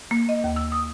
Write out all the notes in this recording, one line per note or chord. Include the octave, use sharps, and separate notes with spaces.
A#3
D#5
D#2
E6
D#6